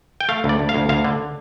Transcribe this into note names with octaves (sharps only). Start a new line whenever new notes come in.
G5
A3 F5
D2
D5
D2
F5
D2
D2 F5
D3